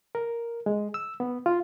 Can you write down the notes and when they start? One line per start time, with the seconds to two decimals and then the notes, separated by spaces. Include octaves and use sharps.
0.15 A#4
0.66 G#3
0.94 E6
1.20 B3
1.46 F4